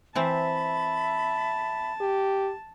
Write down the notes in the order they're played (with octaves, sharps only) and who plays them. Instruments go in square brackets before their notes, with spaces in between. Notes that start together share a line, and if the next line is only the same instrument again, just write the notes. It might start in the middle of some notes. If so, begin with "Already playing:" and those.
[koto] E3 C4 C5 [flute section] E5 B5 [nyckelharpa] A5
[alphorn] G4